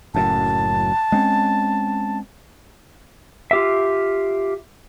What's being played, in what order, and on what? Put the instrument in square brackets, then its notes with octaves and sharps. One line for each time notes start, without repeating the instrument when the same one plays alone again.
[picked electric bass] F#1 F#2 A2 [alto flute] A5
[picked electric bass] G#3 C4 C#4
[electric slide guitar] F4 G4 E5